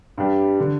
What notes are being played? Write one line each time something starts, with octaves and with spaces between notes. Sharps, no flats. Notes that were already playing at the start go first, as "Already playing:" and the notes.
G2 G3 D4 G4
D3